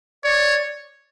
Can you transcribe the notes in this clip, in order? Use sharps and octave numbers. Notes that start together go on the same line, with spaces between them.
C#5 D5